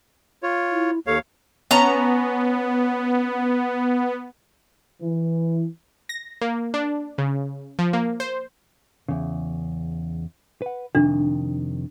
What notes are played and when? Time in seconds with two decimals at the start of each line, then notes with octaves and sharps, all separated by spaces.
0.43 F4 C#5
0.71 E4
1.07 D#2 A4 C#5 F5
1.71 B3 C#4 A5 A#5
5.02 E3
6.09 A#6
6.41 A#3
6.74 D4
7.18 C#3
7.79 F3
7.93 A#3
8.20 C5
9.08 E2 C#3
10.62 B4 F#5
10.95 F2 C3 D#3 D4